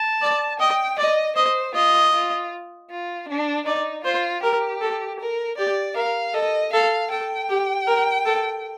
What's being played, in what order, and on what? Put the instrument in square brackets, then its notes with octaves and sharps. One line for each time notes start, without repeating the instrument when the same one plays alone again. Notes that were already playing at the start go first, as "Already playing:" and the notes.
Already playing: [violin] A5
[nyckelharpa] D5
[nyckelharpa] D#5 [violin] G5
[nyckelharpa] D5 [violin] D#5
[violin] C5 [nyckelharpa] D#5
[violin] F4 [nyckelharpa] D#5
[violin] F4
F4
D4
[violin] D#4 [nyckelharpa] D5
[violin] F4 [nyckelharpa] C5
[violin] G4 [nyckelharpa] A#4
[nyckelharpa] A4
[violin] A#4
[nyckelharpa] G4 [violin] D5
[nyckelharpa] A#4 [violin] F5
[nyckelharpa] A4 [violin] D#5
[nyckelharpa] A4 [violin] F5
[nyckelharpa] A4 [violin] G5
[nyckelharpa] G4
A#4
A4